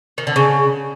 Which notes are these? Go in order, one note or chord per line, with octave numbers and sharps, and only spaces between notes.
D#3
D3
C#3